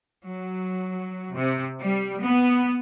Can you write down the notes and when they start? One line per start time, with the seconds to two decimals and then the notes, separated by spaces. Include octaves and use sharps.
0.23 F#3
1.34 C3
1.81 G3
2.24 B3